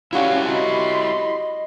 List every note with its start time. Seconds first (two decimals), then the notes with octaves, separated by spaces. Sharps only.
0.13 F#3 G3 C#4 E4 F#4 G4 F5
0.49 F#3 D#5 B5 C6